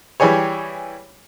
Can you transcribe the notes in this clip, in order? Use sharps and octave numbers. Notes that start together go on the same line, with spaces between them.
E3 G3 G4 G#4 C#5